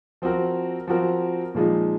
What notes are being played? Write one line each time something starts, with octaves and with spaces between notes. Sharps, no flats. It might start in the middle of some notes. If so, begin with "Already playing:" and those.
F3 C4 F#4 A#4
F3 C4 F#4 A#4
A#2 F3 G#3 D#4